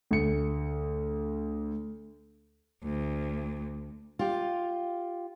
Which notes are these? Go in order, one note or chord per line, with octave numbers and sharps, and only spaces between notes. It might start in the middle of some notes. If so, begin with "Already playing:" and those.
D2 C#7
D2
F4 G4